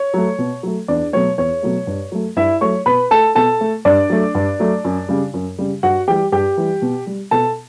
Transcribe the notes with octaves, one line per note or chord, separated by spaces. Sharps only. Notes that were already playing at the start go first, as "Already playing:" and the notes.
Already playing: C#5 C#6
F#3 A3
B2
F#3 A3
E2 D4 D5
B2 F#3 A3 C#5
E2 C#5
B2 F#3 A3
G2
F#3 A3
G2 E4 E5
F#3 A3 C#5 C#6
B2 B4 B5
A3 A4 A5
B2 A4 A5
A3
G2 D4 D5
F#3 A3
G2
F#3 A3
F#2
C#3 G3
F#2
C#3 G3
G2 F#4 F#5
E3 G3 G4 G5
G2 G4 G5
E3 G3
B2
G3
B2 A4 A5